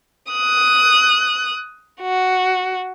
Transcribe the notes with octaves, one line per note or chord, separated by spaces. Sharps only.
D#6 F#6
F#4